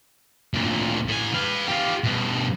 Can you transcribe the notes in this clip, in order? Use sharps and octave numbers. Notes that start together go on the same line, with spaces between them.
D2 A#2
A2 G#5
B4 F5
F4 G4
G2 B2